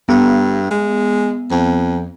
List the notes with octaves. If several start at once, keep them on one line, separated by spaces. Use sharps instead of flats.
G2 B3
G#3
F2